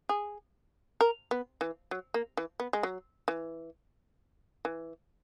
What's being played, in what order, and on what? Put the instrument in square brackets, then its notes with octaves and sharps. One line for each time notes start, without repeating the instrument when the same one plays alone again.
[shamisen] G#4
A#4
B3
E3
F#3
A#3
E3
B3
G#3
F#3
E3
E3